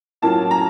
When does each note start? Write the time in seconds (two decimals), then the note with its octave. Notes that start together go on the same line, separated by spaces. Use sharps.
0.22 A2 F#3 A#3 C#4 F4 A5
0.51 A#5